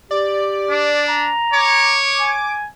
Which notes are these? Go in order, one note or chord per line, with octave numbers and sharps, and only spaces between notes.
G4 D5
D4
A#5
C#5 D6
G#5